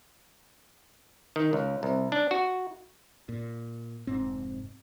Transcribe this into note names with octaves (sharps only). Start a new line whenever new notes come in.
D#3
C#2
C2
D4
F#4
A#2
F1 G#2 C4